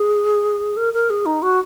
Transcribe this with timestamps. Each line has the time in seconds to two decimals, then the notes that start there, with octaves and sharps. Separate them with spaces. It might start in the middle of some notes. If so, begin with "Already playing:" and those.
Already playing: G#4
0.77 A#4
0.94 A#4
1.10 G#4
1.26 D#4
1.42 F#4